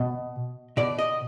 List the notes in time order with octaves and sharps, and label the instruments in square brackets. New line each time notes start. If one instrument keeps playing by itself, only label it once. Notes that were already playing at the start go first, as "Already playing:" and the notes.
Already playing: [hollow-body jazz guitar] B2 D#5
B2 D5
D#5